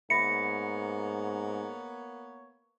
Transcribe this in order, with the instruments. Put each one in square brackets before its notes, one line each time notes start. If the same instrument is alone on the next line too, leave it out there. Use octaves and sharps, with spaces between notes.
[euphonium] G#2 [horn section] A#3 B3 C#5 [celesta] E5 B5 A#6 [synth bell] C#7